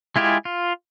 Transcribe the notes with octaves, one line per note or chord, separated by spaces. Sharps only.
G#3 E4 F4 G4 G#4
F4